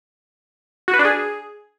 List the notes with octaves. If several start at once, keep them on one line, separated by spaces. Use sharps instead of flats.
F#4
B4
D4
G#4